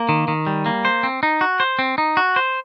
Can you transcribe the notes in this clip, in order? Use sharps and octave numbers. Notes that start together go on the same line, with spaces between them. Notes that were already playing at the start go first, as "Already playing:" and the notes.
Already playing: A#3
D#3
D#3
G3
A#3
C5
C4
D#4
F#4
C5
C4
D#4
F#4
C5